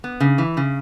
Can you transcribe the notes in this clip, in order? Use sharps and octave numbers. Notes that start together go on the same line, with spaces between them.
B3
C#3
E3
C#3